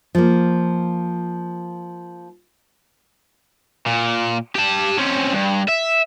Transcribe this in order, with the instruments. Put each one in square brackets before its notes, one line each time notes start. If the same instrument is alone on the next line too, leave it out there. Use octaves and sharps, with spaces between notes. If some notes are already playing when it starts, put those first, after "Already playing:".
[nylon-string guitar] F3 A#3
[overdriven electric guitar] A#2
G4 A5
C4 C#4
G2
E5